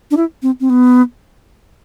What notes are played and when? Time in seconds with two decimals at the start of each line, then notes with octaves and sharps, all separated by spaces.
0.11 D4
0.17 E4
0.42 C4
0.60 C4
0.70 B3